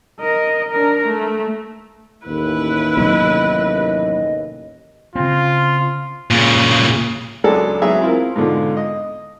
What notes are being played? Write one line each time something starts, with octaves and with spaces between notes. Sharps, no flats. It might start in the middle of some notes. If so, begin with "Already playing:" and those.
A#4 D#5
D4 A#4
A3
A1 D#2 E4 B4
C3 F#3 B3 D#5
C#3 C4 F4
A#2 C#3
C#2 F#3 G#3 D4 A4 G#5
F#3 B3 G#4 E5
C4 E4 F4 A#4
G#2 B2 D3 F4
D#5